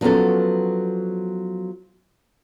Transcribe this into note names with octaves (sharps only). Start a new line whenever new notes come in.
F3 F#3 B3 C#4 A4